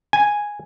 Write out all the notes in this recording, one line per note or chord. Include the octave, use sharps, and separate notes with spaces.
G#5